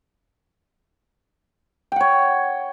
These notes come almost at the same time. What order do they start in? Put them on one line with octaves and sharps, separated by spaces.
G5 F#5 C#5